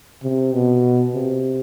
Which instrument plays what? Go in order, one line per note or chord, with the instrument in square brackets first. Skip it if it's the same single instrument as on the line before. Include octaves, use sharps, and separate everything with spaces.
[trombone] C3
B2
C3